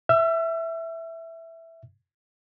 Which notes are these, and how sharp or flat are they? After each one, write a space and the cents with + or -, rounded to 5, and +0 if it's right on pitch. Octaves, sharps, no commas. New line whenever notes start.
E5 +0 E6 +45